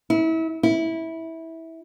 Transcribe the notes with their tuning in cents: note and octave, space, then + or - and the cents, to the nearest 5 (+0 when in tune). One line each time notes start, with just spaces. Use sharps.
E4 -30
E4 -15